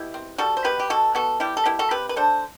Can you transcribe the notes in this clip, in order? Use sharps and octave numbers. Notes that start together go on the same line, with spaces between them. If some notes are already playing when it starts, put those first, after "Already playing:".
Already playing: B2 E4 G4
C4
G3 F#4 A4
C5
B2 G4 B4
G4
B2 F#4 A4
B3 F#4 A4
G3 E4 G4
A4
B2 E4 G4
F#4 A4
C3 G4 B4
B4
D4 A4 C5